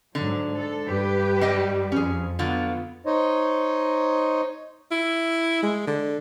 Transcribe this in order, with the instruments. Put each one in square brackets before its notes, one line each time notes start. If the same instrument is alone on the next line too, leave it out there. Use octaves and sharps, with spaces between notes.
[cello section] G#2 F#3 [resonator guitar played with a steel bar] D3
[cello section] A4
G2 G4 B4
[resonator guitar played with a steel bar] G3 D#5 G5
[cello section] F2 [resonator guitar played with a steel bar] C#4 G#4
[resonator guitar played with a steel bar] D3 F#3 F4 [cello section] B3
[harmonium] D#4 C5 C#5 D#5
[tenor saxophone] E4
G#3
D3